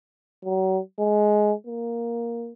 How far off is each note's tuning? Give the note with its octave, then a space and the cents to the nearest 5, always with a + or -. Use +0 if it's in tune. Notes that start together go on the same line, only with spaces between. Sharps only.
F#3 +35
G#3 +15
A#3 +5